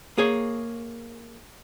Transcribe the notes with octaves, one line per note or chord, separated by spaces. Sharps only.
A#3 G#4 C#5